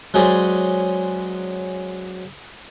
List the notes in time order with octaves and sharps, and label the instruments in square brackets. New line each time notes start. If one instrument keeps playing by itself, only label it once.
[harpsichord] F#3 G#3 C#4 G#4 C5 D5